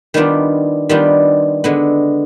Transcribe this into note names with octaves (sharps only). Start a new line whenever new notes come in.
D#3 G3 B3 D4 F4
D#3 G3 B3 D4 F4
D3 G#3 B3